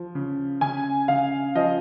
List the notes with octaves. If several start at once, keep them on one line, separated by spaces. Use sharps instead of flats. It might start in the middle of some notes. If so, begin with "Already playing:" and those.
Already playing: F3
C#3
C#3 G#5
C#3 F5
F3 D#5